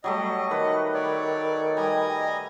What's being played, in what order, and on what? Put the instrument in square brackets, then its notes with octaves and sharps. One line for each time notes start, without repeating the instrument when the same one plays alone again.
[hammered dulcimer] F#3 G3 A3 [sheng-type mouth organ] D#5
[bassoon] D#3 [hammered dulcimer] B4
[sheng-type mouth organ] C#5 D5
[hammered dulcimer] G3 [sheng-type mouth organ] D#5 G#5 A#5